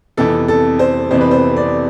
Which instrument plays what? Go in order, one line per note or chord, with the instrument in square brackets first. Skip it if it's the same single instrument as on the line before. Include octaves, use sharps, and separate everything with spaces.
[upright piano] F2 C3 E3 B3 A4
A4
C5
F2 C3 E3 B3 C5
B4
C5
D5